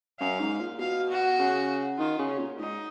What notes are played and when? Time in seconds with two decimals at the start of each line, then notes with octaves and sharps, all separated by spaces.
0.20 F#2 F5
0.40 G#2
0.60 A#2
0.79 B2 F5
1.09 F#4
1.39 C#3
1.98 D#3 F4
2.19 C#3
2.29 C#4
2.39 A#2
2.59 G#2 D#4